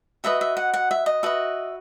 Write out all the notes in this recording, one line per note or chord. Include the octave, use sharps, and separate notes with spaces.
F#4 B4 D#5 E5
E5
F#5
F#5
E5
D#5
F#4 B4 D#5 E5